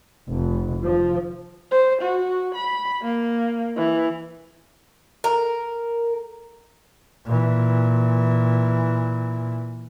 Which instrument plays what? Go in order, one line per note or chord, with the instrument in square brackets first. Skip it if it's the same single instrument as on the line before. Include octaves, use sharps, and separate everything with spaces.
[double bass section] F1
F3
[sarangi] C5
F#4
B5
A#3
E3
[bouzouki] A#4
[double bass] A#2 E3